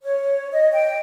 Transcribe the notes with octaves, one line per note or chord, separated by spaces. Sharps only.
C#5
D#5
G5